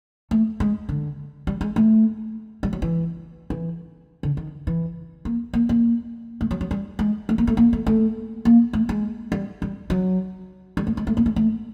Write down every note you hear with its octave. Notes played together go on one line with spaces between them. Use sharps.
A3
G#3
D3
G3
G#3
A3
G3
F#3
E3
E3
D3
D#3
E3
A#3
A#3
A#3
A3
F#3
F#3
G3
G#3
A3
A#3
A3
A#3
A3
A3
A#3
A3
G#3
G3
G3
F#3
G3
A3
G#3
A3
A#3
A3
A3